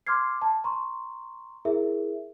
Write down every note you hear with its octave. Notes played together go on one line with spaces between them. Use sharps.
C6 D6 F6 G#6 C7
A5
A#5 C6 C#6
E4 G#4 A#4 E5